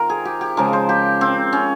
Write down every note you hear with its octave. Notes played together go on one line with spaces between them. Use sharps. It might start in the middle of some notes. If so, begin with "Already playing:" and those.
Already playing: D#3 C4 F4 A#4
G#4
G4
G4
C#3 F3 G#3 A#4
C5
G4
C4
C#4